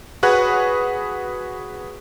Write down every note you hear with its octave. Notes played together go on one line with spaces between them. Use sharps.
F#4 G#4 B4 C#5 F#5 F#6